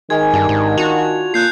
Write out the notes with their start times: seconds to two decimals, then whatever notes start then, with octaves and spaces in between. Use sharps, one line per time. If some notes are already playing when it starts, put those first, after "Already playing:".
0.10 D#3 G#3 G#6
0.33 G2 D4 G4
0.49 G#2
0.78 F4 F#4 G#5 A5 F7
1.34 A#2 F#6 G6 C7